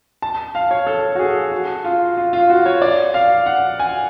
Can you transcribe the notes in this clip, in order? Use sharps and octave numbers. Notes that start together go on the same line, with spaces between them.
A5
F5
C#5
A4
F#4
G#4
F#4
F4
F4
F4
F#4
C#5
D5
F5
F#5
G#5